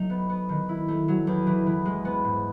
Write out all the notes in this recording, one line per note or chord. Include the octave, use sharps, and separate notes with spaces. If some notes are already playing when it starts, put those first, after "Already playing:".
Already playing: F#3 A3 D#4
B3
B3
D#3
E4
A3
F#3
E2
E3
E3
G#3
B3
G#2